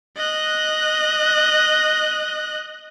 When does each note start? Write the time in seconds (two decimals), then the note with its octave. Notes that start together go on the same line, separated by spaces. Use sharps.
0.17 D#5 F#6